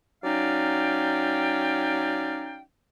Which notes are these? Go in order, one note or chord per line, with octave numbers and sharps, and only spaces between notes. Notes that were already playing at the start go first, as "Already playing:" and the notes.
F#3 C#4 D#4 D5 F5 G5